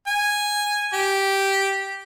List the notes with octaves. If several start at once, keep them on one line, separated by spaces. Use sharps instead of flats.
G#5
G4